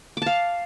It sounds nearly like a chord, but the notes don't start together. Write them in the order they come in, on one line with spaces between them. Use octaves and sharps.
D6 A5 F5